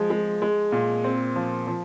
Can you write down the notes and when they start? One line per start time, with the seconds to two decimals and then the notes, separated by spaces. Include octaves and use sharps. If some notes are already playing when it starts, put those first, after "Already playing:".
Already playing: F3 G#3
0.10 G#3
0.42 G#3
0.72 A#2
1.04 C4
1.36 F3
1.67 F3